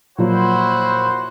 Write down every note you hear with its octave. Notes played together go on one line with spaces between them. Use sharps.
A#2 F3 F#3 E4 F#4 C5